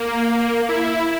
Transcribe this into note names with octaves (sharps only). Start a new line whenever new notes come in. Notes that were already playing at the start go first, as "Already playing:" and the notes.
Already playing: A#3
E4